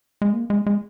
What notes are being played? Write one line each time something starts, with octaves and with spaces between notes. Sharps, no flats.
G#3
A#3
G#3
G#3